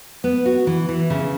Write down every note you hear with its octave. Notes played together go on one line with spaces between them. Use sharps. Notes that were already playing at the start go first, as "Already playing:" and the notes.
B3
F#4
E3
E3
C#3